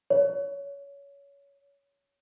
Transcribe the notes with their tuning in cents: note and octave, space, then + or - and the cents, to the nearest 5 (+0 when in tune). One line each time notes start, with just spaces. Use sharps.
C#5 +20